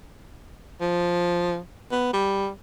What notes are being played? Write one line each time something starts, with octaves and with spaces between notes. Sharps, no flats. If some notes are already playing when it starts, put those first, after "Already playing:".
F3
B3
G3